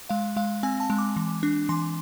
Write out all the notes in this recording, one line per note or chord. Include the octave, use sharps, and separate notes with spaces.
G#3 F5
G#3 F5
C4 G#5
A5
G#3
D6
E3
D4
E3 C6